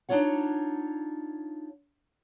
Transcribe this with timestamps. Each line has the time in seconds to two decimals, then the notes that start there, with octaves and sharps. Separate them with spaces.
0.09 D4 D#4 F4 C#5 F#5